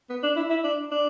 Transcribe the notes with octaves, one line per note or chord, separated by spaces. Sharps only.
B3
D4
E4
E4
D4
D4